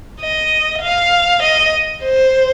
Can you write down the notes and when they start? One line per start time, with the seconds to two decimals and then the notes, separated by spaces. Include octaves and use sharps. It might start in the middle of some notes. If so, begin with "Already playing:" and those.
0.21 D#5
0.82 F5
1.43 D#5
2.04 C5